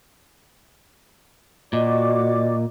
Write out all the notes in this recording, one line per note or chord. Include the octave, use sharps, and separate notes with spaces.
A#2 F#4 D5 D#5 D6